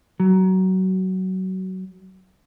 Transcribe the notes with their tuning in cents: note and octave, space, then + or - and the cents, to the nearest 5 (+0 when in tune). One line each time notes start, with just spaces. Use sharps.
F#3 +20